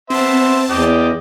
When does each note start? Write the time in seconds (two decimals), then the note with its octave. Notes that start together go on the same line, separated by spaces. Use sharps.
0.10 B3 C4 C5 E5 A5
0.70 E2 D#5 G5 D6